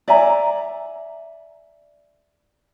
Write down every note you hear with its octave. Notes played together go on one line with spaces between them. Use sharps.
D5 E5 G#5 A#5